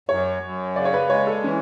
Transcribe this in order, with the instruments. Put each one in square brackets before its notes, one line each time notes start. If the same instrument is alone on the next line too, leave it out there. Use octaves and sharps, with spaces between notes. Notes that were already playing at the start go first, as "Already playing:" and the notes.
[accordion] F#2 [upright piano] C#5
[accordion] F#2
[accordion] C#3 [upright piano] D5
[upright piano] C#5
B4
[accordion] G#3 [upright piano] C#5
[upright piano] A4
[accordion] E3 [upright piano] C#4